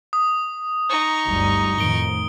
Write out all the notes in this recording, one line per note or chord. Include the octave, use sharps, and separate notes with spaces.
D#6
D#4 C#6
G1 D2 G3
F2 A2 D#3 D7 G7